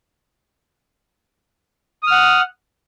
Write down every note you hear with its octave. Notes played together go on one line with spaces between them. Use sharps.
F#5 D#6 F6